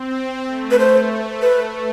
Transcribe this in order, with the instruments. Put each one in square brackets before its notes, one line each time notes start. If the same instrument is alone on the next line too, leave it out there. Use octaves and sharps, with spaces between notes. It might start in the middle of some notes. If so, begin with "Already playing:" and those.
Already playing: [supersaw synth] C4
A3
[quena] B4
C5
B4